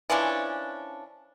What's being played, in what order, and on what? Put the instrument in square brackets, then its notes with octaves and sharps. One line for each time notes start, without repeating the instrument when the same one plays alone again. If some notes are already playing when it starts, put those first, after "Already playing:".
[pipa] E3 F3 C#4 D4